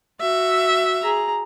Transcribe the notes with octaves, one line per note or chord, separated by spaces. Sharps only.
F#4 E5
G#4 A#5